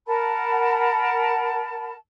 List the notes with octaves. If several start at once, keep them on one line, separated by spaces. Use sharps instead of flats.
A#4 F#5 A5 B5